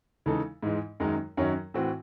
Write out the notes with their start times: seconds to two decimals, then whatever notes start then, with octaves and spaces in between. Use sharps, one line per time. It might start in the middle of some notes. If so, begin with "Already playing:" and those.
0.26 C#3 E3 G#3 D#4 A4
0.63 G#2 E3 G#3
1.00 F#2 D#3 G#3 D#4
1.37 F#2 D#3 F#3 C#4
1.74 A2 E3 C4 F#4